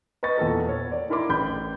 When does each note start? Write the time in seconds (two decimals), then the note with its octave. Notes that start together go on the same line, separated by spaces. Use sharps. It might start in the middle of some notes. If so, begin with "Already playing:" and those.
0.23 B4 D#5 C#6 A6
0.37 E2 A#2 A4 A#4
0.69 C#5
0.92 D5
1.10 D#4 E4 A#4 B5 C6 D6
1.29 A1 B5 G6